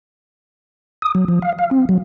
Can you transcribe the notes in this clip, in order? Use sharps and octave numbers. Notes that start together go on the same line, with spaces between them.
D#6
F#3
F3
F5
F5
C4
F#3